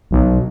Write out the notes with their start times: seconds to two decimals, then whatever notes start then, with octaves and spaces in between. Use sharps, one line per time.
0.11 B1